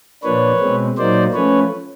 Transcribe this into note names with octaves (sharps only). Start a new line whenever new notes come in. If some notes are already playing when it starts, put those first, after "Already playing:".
A#2 F3 A#3 D4 B4 C#5
B2 G#3 C4
A#2 F#3 A#3 D#4 C5 D5
F3 A3 C#4 B4 C#5